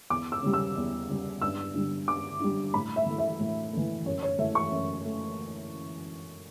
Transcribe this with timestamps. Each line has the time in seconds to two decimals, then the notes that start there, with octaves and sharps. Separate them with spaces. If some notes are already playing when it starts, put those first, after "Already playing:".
0.10 E2 D6
0.32 E6
0.43 C#3 G3
0.53 E6
0.76 E2
1.09 C#3 G3
1.42 G2 E6
1.74 D3 G3
2.08 G2 D6
2.40 D3 G3
2.74 A2 B5
2.96 E5
3.06 E3 A3
3.18 E5
3.40 A2
3.73 E3 A3
4.05 F#2 C#5
4.23 C#5
4.38 E3 A3 E5
4.55 C#6
4.72 F#2
5.05 A3